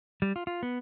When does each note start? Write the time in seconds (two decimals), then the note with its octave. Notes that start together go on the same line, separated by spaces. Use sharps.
0.22 G3
0.36 F4
0.47 F4
0.63 B3